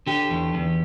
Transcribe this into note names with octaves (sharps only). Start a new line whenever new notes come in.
D3 G4
E2
E2